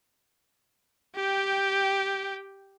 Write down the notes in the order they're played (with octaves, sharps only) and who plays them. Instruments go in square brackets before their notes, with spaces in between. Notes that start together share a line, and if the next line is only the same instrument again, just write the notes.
[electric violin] G4 G5